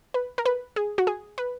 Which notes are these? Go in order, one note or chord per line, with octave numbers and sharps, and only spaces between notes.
B4
A#4
B4
G#4
F#4
G#4
B4